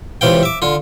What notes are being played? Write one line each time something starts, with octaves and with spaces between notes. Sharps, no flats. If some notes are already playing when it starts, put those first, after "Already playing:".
C#2 C3 E3 F5 G5
E5 D6
D3 F4